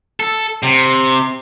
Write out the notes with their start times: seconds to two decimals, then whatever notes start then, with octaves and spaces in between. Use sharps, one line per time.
0.20 A4
0.63 C3